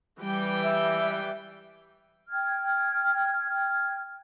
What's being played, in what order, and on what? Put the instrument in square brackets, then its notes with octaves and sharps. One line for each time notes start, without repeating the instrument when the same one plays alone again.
[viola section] E3 G3 G5
[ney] E5
[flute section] G5 F6 G#6